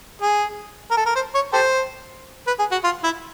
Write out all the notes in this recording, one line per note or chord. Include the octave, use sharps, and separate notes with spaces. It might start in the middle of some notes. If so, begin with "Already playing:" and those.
G#4
A#4
A4
A#4
C5
C#5
G4 A4 C5
B4
G#4
F#4
F4
E4